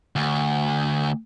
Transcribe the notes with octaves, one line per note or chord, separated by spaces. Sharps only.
D2